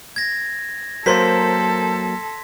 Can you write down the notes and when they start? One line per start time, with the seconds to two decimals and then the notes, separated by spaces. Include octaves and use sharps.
0.16 G#6 A#6
1.06 F#3 A#3 A4 A#4 C5 C6 B6